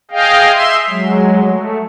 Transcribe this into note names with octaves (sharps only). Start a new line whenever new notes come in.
G#4 D#5 F5 G5
E5 C6
F#3 G#3
A3